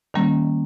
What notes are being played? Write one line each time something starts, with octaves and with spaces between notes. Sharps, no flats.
D#3 G3 A#3 C#4